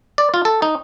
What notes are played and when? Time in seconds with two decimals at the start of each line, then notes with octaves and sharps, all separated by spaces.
0.18 D5
0.34 F4
0.45 A4
0.62 D#4